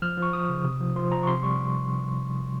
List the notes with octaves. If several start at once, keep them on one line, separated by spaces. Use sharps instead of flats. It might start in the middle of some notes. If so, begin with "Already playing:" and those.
F3 F6
F3 C#6
F3 D#6
C#3
C3
F3
F3 C6
F3 A#5
C#6
C3 C6
G3 C#6